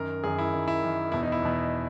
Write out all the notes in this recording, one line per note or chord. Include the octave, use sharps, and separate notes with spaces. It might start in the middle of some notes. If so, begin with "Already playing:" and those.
Already playing: F#2 D#3 A#4
F#2 D#3 G#4
E4
F#2 D#3
E4
F#2 D#3
E2 B2 E4
D#4
E4
E2 B2